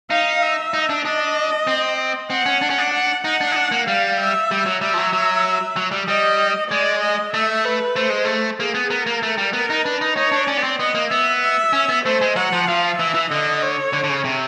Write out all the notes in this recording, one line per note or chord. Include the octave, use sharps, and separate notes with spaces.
D#4 F5
E5
D#4
D4
D4 D#5
C4
C4 F#5
C#4
D4
C#4
D4
F#5
D#4 F#5
D4
D#4
D4
A#3
G3 F5
E5
G3
F#3
G3 E5
F3
F#3
F#3
F#3
G3
G3 D#5
G#3 D5
D#5
A3 E5
B4
A3 C5
G#3
A3
A#3 G#4
B3
B3 A#4
A#3
A3
G3
B3 A#4
D#4
D4 B4
D#4
D#4 C#5
D4
C#4 D5
B3
C4
B3 D#5
A#3
B3 E5
E5
C#4
B3
A3 C5
G#3
F#3 F#5
F3
F3 F5
E3 E5
E3
D3 D#5
C#5
D3
D3
C#3
C3